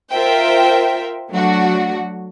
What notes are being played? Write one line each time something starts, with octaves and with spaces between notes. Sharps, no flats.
F4 A#4 C5 E5 G5
F#3 A3 D4 F#4